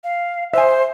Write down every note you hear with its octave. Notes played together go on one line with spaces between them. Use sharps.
F5
C5 E5 G#5